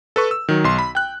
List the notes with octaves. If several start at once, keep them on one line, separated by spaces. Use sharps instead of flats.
A4 B4 C#6
E6
D#3 F#3
B1 C6
B5
G5 F#6